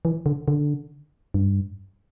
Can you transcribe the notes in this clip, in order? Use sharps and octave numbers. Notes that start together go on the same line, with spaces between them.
E3
D3
D3
G2